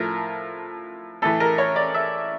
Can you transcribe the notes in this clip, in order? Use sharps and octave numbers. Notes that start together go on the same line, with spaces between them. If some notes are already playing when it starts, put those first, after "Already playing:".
Already playing: A2 F3 A#4
A2 E3 A4
A#4
C#5
D5
E5